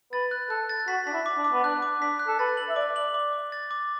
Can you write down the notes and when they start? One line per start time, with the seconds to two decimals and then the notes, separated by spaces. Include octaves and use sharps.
0.12 B4 A6
0.31 F#6
0.50 A4 F#6
0.69 A6
0.88 F#4 B6
1.07 D4 B6
1.13 E4
1.26 D6
1.38 D4
1.44 D6
1.53 B3
1.64 D4 F#6
1.82 D6
2.01 D4 B6
2.19 F#6
2.27 A4
2.39 B4 A6
2.57 F#7
2.69 E5
2.76 D5 D6
2.96 F#7
3.14 D6
3.33 D6
3.52 A6
3.71 D6